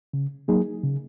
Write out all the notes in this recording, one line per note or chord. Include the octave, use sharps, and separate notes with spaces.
C#3
F#3 A#3 D#4 G#4
C#3